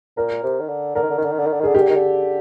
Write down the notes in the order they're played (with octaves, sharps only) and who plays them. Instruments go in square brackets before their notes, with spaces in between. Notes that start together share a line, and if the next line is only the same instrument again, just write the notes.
[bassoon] A#2 [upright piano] A#4
[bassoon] C3
D#3
D3
[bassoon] D3 [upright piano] A#4
[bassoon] D#3
D3
D#3
D3
D#3
D3
D#3
D3
D#3
[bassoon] D3 [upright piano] G#4
[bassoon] D#3 [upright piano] G4
[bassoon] D3
D#3
D3